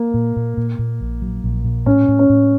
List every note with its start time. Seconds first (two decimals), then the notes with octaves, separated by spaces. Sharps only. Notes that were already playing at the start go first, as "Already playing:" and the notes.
Already playing: A#3
0.14 A#2
0.36 A#2
0.57 A#2
0.79 A#2
1.01 A#1
1.22 F#3
1.44 A#1
1.65 A#2
1.86 A2 C#4
2.08 A2
2.19 C#4
2.29 A2